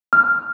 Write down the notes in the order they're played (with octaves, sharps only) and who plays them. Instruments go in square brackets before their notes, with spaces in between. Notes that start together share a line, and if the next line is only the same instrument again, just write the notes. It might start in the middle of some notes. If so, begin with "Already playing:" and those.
[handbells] F6